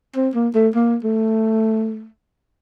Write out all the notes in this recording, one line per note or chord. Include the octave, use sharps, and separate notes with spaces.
C4
A#3
A3
A#3
A3